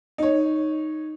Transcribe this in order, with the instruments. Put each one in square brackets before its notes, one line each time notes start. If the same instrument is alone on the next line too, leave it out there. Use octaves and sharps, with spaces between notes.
[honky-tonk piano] D#4 C#5